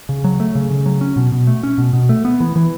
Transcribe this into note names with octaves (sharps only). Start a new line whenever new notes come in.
C#3
F#3
A3
C#3
C#3
F#3
C#4
B2
B2
A3
C#4
B2
B2
A3
B3
E3
E3